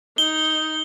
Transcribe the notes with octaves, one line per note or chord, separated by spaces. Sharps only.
D#4 G7